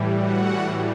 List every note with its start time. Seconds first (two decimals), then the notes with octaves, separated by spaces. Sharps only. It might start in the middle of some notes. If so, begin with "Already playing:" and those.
Already playing: A2 E3 G3
0.17 F#4 F#5